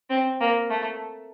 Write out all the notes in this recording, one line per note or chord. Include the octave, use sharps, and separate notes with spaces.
C4
A#3
A3